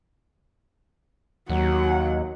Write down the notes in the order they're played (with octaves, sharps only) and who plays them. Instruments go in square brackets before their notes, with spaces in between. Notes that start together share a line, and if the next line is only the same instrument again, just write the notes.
[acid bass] D#2 [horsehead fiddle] F#3 F#5